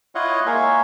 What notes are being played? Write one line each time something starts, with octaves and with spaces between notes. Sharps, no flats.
E4 F4 C#5 D#5 F5 F#5
G#3 A#3 C#5 E5 F5